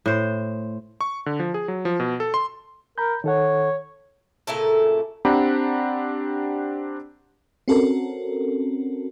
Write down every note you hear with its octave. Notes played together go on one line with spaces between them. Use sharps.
A2 C5
C#6
D3
F3
G#4
F#3
F3
B2
A4
C6
A#4 A#5 B5 G6
D#3 A4 C#5 F#5
A#2 C#3 E4 A4
C4 D4 G4 F#5 A#5 B5
C4 C#4 F#4 A4 A#4